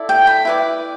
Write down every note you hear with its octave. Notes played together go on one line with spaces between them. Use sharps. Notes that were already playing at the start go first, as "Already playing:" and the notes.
Already playing: E4 A4 D5
G5
B5
E4 B4 D5